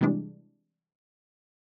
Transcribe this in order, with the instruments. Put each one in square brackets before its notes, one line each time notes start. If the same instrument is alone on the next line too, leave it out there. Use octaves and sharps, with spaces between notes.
[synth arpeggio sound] C3 E3 G3 G#3 D4